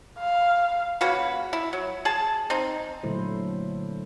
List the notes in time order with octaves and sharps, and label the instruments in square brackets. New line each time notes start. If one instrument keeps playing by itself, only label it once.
[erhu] F5
[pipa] C#3 A#3 F#4 B4
E4
F#3
G#4 A5
C4 D#4
[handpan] A#2 D3 F#3 A3 E4 C5